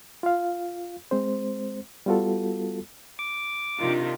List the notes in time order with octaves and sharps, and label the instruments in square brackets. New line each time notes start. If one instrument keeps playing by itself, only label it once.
[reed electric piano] F4 F5
G#3 C4 C5
G3 B3 F4 F#4 A4
[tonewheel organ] D6
[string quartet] C3 D#3 [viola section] D4 F4